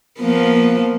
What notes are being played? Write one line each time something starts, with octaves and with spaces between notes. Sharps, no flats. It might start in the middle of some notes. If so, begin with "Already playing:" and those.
F3 A#3 B3